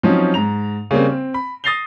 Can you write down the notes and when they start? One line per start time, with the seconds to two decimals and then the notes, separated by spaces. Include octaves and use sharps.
0.03 F3 F#3 C4 C#4 D#4
0.34 G#2 A#5 F7
0.91 C#3 G3 A#3 C4
1.09 C4
1.34 B5
1.64 D#6 A6 A#6 C7 F7 G7